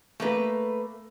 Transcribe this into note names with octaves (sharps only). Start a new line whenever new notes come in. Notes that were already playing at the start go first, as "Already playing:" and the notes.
A3 A#3 B4